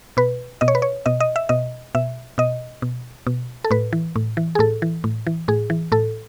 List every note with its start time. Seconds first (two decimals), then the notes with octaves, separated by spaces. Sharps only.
0.17 B2 B4
0.61 B2 D#5
0.68 C#5
0.75 B4
0.82 C#5
1.06 B2 D#5
1.20 D#5
1.36 E5
1.49 B2 D#5
1.95 B2 E5
2.38 B2 D#5
2.82 B2
3.27 B2
3.64 A4
3.71 A2 B4
3.93 E3
4.16 A2
4.37 E3
4.55 G#4
4.59 A2 A4
4.82 E3
5.04 A2
5.27 E3
5.48 A2 G#4
5.70 E3
5.92 A2 A4